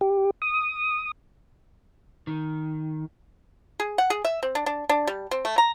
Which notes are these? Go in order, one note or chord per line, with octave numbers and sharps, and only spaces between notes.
G4
D#6
D#3
G#4
F#5
G#4
E5
C4
D4
D4
D4
G3
C4
A3
A#5